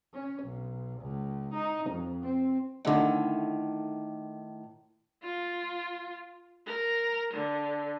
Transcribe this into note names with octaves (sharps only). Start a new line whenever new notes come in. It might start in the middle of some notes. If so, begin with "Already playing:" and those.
C#4
B1
C#2
D#4
F2
C4
A2 D3 D#3 D#4
F4
A#4
D3